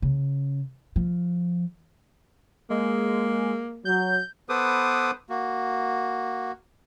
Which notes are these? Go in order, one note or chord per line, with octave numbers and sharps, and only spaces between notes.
C#3
F3
G#3 A#3
F#3 G6
B3 A4 B4 C5 D6 D#6
A#3 F#4